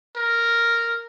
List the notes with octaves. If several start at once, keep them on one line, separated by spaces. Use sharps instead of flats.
A#4